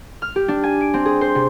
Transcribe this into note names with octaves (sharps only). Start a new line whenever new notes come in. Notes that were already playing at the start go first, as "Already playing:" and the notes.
F6
G4
D4
G#5
D7
C4
G#4
C5
C3